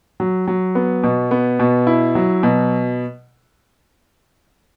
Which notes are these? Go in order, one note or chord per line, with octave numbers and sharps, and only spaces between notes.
F#3
F#3
B3
B2
B3
B2
E4
F#3
B2